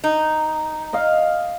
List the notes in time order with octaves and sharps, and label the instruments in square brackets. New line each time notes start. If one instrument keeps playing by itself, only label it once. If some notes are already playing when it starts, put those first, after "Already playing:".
[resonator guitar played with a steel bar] D#4
[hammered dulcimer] D#5 F5